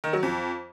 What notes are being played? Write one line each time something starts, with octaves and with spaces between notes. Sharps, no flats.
D#3
F#3
F2